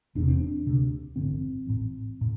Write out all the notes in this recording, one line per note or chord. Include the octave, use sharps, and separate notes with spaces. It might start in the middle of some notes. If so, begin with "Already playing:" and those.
E1 E2 C3 D4
C4
D4
D2 C3
A1 G2 D3 C4
A1 A2
A2